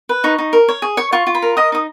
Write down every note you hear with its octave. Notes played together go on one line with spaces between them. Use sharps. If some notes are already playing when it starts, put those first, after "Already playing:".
B4
D#4 C#6
D#4
A#4
C#5
G#4
C#5 C#6
F4 C#6
F4
B5
A#4
D#5 D#6
D#4 D#6